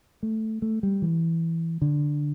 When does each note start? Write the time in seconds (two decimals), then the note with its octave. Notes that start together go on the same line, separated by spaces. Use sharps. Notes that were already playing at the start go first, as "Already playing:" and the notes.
0.23 A3
0.62 A3
0.83 G3
1.02 E3
1.82 D3